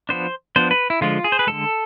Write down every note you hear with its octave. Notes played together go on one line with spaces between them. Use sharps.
F3 B3 D4 C5
F3 B3 D4 C5
B4
E4
D3 F3 G#3 F4
G#4
C5
B4
D3 F3 G#3 A4